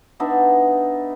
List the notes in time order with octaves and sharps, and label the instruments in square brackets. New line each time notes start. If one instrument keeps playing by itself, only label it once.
[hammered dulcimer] B3 D4 D#4 E5